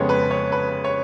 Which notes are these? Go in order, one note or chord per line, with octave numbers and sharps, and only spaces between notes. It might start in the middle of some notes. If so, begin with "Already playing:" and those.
Already playing: F2 C#3 G#3 B3 C#5
B4
C#5
B4
C#5